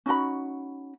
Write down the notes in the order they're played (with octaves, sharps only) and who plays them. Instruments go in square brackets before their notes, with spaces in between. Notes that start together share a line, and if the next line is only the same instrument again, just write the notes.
[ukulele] C#4 D#4 F#4 B5